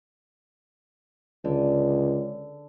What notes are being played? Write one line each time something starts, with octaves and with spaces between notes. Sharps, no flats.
C#2 D3